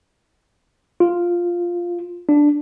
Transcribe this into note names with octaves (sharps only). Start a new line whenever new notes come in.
F4
D4